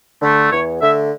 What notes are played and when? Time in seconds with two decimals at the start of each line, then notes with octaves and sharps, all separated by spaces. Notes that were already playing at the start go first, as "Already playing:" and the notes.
0.21 D3 A3
0.51 E2 C#5
0.81 D3 A3 E5